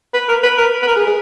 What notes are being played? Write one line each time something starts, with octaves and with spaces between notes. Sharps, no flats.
B4
A#4
B4
A#4
B4
A#4
G#4
G#4